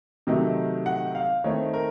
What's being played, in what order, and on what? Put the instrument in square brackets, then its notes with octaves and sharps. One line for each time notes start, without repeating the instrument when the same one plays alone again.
[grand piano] C3 D#3 F#3 A3 D#4
F#5
F5
D#3 A3 C4 D#4 C#5
A#4